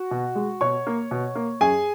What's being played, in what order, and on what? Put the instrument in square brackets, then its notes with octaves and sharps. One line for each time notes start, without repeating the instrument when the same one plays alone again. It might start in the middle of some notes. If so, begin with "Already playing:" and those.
Already playing: [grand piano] F#4
B2
G#3
B2 C#5 C#6
A#3
B2
A#3
F#2 G#4 G#5